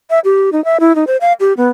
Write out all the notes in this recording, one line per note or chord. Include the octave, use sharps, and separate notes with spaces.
E5
G4
D#4
E5
E4
D#4
C5
F5
G4
B3